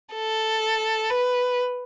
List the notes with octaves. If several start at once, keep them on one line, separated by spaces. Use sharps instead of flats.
A4
B4